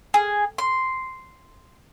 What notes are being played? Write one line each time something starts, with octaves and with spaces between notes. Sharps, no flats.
G#4
C6